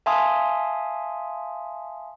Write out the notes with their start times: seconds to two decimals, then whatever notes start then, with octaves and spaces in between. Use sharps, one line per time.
0.06 E5 F5 G#5 A5 C6 D#6